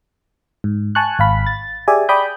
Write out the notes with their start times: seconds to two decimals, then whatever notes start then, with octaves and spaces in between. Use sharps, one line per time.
0.64 G#2
0.95 G#5 A5 C#6 F#6
1.19 G#1 F5 B5
1.46 A6
1.88 G4 G#4 D5 E5 G#5
2.09 D5 G5 B5 D#6 G6